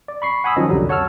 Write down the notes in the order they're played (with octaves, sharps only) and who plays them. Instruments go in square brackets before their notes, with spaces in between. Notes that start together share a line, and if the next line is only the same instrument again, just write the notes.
[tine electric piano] D5
B5 C#6 C7
F#5 G#5 B5 D#6 E6
D#3 F3 F#3 C#4 D#5
C2 F2 D3 F#3 G3
C#5 F#5 A5 E6 F6